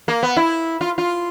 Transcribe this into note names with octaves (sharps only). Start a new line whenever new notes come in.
A#3
B3
E4
F4
F4